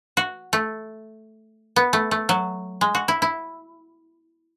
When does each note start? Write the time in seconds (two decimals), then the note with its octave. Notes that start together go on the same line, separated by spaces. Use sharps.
0.17 F#4
0.53 A3
1.76 B3
1.93 A3
2.11 A3
2.29 F#3
2.81 G#3
2.95 F#4
3.08 E4
3.22 E4